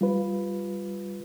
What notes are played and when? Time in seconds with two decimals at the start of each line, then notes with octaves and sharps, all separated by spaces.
0.01 G3 F4 B4